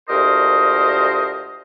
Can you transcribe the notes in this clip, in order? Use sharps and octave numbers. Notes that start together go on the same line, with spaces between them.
D2 A#2 G4 A#4 C5 D#5